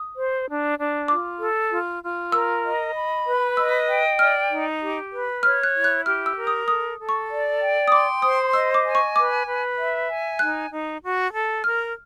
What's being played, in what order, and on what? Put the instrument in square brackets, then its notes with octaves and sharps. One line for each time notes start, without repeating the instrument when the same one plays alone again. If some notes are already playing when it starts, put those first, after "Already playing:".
Already playing: [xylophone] D#6
[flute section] C5
D4
D4
[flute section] F4 [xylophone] D6
[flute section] A4
F4
F4
[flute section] A#4 [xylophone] E6
[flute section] D#5
B5
B4
[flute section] D#5 [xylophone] E6
[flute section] G5
[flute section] D5 [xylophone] F6
[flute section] D#4
G4
B4
[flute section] C#5 [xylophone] F6
[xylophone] F#6
[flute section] E4
[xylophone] F#6
[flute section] G4 [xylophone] F6
[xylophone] E6
[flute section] A#4
[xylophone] D#6
[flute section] A4 [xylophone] D#6
[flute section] A4
[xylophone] C#6
[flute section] D5
G5
[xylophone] D#6
[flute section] C6 [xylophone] D6
[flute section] C5 [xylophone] D#6
[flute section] D#5 [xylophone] E6
[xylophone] D6
[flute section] G#5
[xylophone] C#6
[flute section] B4 [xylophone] D6
[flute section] B4
E5
G#5
[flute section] D#4 [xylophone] F#6
[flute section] D#4
F#4
A4
[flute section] A#4 [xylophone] F6